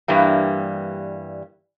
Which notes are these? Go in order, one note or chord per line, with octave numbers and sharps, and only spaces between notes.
G2 E3 G3 A#3